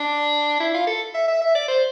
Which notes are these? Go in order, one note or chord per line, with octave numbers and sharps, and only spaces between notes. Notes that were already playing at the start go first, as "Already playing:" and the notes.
Already playing: D4
E4
F4
A4
E5
E5
E5
D5
C5